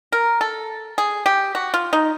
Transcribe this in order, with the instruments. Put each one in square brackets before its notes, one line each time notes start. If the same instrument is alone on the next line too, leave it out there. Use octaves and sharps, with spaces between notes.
[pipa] A#4
A4
G#4
G4
F#4
F4
D#4